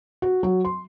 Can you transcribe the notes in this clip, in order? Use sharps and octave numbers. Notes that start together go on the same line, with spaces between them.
F#4
F#3
C6